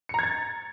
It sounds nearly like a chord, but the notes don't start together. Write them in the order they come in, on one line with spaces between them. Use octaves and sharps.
C#7 A#5 G#6 A6